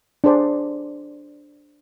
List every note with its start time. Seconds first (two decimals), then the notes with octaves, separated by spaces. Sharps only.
0.24 D4 G#4 C5 D5